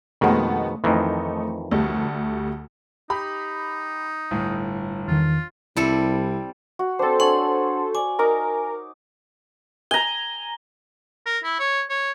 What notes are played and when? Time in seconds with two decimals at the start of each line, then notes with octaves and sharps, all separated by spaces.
0.21 F2 B2 D#3 G#3 A3 B3
0.84 F2 D#3 E3 A3 D#4
1.71 D2 G3 A3
3.10 D#4 G4 B5
4.31 G1 A2
5.08 E2 D#3 F4
5.76 C2 G3 C4 E4 A4
6.79 F#4
6.99 C4 D4 A4 C5
7.20 D4 C#5 F#5 G#5 C6
7.95 D5 G#5
8.19 D#4 A#4 D6
9.91 G#5 A#5 G7
11.26 A#4
11.44 E4
11.59 C#5
11.89 C#5